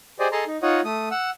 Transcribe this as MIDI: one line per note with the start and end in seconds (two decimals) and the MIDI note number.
0.20 0.28 67
0.20 0.28 68
0.20 0.28 72
0.20 0.28 74
0.20 0.28 75
0.32 0.45 68
0.32 0.45 69
0.32 0.45 75
0.32 0.45 81
0.32 0.45 82
0.32 0.45 84
0.47 0.57 63
0.62 0.81 63
0.62 0.81 65
0.62 0.81 73
0.62 0.81 75
0.62 0.81 78
0.84 1.09 57
0.84 1.09 87
1.11 1.30 78
1.11 1.30 88